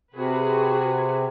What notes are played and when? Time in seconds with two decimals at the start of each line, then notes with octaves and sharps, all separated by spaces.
0.14 C3 F#4 G#4 B4